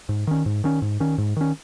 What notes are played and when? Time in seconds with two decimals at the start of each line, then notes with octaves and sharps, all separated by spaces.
0.09 G#2
0.27 D#3 C#4
0.46 G#2
0.64 D#3 C#4
0.82 G#2
1.00 D#3 C#4
1.18 G#2
1.36 D#3 C#4